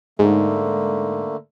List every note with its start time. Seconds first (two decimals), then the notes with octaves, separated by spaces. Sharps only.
0.19 G#2 D3 A3 A#3